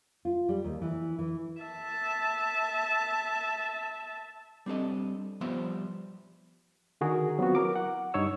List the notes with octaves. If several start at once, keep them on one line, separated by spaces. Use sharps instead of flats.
F4
G3
D#2
E3
E3
E5 A5
G3 C4 D4 A4 D#5
F3 G3 B3 C5 E5 C6
D3 D#3 F#4 G#4 A#4
F#3 B3 C4 F4 F#4
E4 A#4 D6
F#5
G2 D#4 C#5 E6